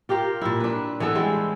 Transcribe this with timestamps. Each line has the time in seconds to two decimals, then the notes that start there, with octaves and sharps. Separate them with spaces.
0.09 F4 G4 A#4 F5
0.41 A#2 E4
0.60 D4 B4
1.00 E3 B3 E4 A4
1.15 G3 G#3 C4 E4